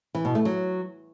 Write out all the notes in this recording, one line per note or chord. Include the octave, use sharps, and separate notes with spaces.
E3
B2
A3
F#3